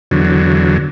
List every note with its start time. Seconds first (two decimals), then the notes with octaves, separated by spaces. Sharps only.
0.11 E2 D3 F#3